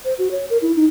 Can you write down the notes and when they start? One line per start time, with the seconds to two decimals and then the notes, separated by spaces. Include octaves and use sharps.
0.05 C5
0.19 F#4
0.31 C#5
0.50 A#4
0.62 E4
0.76 D#4